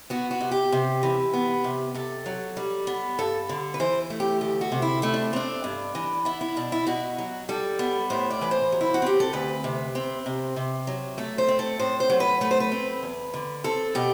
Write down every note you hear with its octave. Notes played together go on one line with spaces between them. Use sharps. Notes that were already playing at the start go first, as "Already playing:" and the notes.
B3 F#4
F#4
C3
G4
C3
E3
B3
C3
C3 A4
F#3
G3
B3
G2 A4
D3
B4
E3 C5
A3
G4
D2 G4
F#4
C3
E4
A3 E4
D4
C4 D4
G2
E3
B3 E4
E4
B2 D4
E4
B2 F#4
F#3
G3 A4
B3
A2 C5
D5
E3 B4
C5
F#3
E4
F#4
C4 G4
A4
D2 B4
C3
C4
C3
C3
F#3
A3 A4
C5
C4
A4
A2 C5
C5
F#3
B4
A3 B4
C5
B4
C4
E2
D3
C4 A4
B2 G4